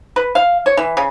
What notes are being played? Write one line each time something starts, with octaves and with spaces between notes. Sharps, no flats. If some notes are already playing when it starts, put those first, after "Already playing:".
B4
F5
C#5
E3
C#3